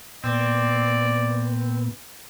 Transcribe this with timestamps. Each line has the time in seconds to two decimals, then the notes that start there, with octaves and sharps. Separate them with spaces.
0.24 A#2 B3 C4 D5